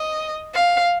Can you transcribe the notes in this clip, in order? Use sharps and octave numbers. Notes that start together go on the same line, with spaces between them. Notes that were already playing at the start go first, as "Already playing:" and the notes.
Already playing: D#5
F5